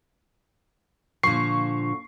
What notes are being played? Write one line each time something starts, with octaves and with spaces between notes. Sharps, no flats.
A#2 D3 F3 C#6 C7